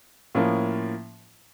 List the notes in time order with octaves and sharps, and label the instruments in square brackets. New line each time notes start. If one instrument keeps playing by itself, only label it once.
[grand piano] A2 F3 A#3 C#4 F4